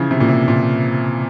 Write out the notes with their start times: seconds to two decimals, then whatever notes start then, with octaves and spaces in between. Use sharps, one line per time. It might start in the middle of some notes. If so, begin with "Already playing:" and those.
Already playing: C#3 E3 F3
0.11 C3
0.20 A#2
0.28 C3
0.48 A#2